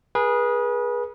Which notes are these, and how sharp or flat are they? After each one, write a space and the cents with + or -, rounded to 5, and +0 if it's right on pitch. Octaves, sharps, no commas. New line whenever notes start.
G#4 +0 B4 -35